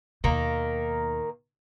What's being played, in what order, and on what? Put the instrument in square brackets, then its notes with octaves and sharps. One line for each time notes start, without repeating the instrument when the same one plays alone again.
[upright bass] D#2 B2 [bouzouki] D#3 A#3